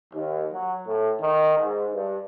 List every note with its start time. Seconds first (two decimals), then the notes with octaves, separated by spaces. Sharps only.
0.14 D#2
0.52 F#3
0.87 A2
1.21 D#3
1.58 G#2
1.94 G2